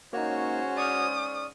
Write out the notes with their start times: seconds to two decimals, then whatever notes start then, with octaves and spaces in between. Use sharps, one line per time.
0.13 G#2 A#3 C#4 D#4 F#4 C5 C#5
0.77 D5 C#6 D#6 F6